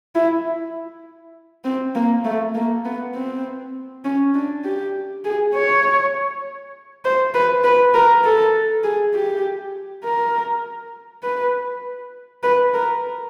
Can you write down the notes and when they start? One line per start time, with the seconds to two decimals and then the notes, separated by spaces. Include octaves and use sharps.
0.15 E4
1.65 C4
1.95 A#3
2.25 A3
2.55 A#3
2.85 B3
3.15 C4
4.04 C#4
4.35 D4
4.64 G4
5.25 G#4
5.54 C#5
7.05 C5
7.34 B4
7.64 B4
7.94 A#4
8.24 A4
8.84 G#4
9.14 G4
10.04 A#4
11.24 B4
12.43 B4
12.74 A#4